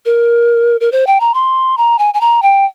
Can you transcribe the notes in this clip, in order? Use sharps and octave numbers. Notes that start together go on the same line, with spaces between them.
A#4
A#4
C5
G5
A#5
C6
A#5
G#5
G#5
A#5
G5